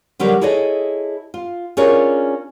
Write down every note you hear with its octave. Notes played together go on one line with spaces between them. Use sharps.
D3 F#3 G3 A#4 B4
E4 G#4 A4 C#5 D#5
F4
C#4 D4 F4 G#4 A#4 C#5